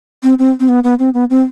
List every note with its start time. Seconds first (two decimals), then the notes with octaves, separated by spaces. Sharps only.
0.23 C4
0.39 C4
0.60 C4
0.69 B3
0.84 B3
0.99 C4
1.14 B3
1.30 C4